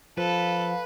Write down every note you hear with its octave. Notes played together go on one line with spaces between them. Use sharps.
F3 A4 B4 F5